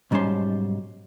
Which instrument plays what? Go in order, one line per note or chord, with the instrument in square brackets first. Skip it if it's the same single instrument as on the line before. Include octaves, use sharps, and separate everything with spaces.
[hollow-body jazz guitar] B1 G#2 G3 C#4 A5 C6